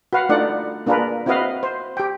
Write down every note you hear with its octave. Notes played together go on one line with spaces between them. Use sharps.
F#4 B4 F5 F#5
A3 D4 D#4 F4 D5 F#5
A#3 D4 F4 G#4 A#4 B4
C4 E4 F#4 B4 D#5 F5
C5
G4 G5